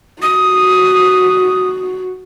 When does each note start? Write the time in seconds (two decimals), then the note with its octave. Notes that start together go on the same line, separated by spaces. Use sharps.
0.22 F#4 D#6